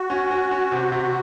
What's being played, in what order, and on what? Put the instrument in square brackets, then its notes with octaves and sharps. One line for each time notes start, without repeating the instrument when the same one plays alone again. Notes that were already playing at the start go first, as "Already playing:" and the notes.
Already playing: [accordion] F#4
[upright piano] C#4
C#4
C#4
C3
C3